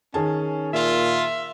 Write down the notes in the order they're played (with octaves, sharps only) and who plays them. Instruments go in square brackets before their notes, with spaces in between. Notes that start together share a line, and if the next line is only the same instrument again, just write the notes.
[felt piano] D#3 G#4 A5 [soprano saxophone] C#4
[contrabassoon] A#2 [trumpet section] F4 [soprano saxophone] E5